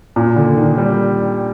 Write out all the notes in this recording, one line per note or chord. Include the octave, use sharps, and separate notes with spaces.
A#2
D3
D#3
G3